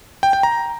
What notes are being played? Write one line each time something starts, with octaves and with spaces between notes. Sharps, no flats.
G5
G5
A#5